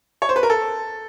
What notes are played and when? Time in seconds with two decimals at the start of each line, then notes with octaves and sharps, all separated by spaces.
0.22 C#5
0.29 C5
0.36 B4
0.43 A#4
0.50 A4